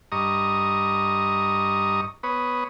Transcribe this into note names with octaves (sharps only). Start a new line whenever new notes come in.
G2 D#5 A#5 C#6 D#6
B3 B4 C#5 D#6